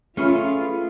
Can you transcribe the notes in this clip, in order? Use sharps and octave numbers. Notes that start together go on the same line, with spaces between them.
A3 C#4 F4 G#4 B4 E5